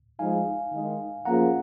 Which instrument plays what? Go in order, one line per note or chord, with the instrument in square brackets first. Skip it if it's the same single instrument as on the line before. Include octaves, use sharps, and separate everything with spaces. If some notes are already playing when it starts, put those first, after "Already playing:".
[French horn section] F3 G#3 D#4 G#4 [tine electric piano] F5 G#5
[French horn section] D#3 G#3 D#4
[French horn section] F3 A#3 C#4 F4 G#4 [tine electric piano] F#5 A#5